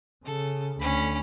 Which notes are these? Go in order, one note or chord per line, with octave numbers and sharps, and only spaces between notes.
C#3 A4
D2 C#4 B5